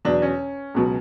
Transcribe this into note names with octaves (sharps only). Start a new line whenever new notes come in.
E2 B2 F#3 D4
C#4
C#2 B2 F#3